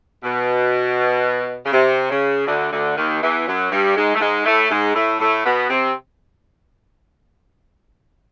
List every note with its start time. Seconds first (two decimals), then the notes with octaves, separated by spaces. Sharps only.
0.24 B2
1.66 C#3
1.73 C3
2.10 C#3
2.46 D2 D3
2.71 D2 D3
2.96 D#2 D#3
3.21 E2 E3
3.46 F#2 F#3
3.71 G2 G3
3.96 G#2 G#3
4.15 A3
4.20 G#2 G#3
4.45 A2 A3
4.70 G#2 G#3
4.95 A2 A3
5.19 A2 A3
5.44 B2 B3
5.69 C3 C4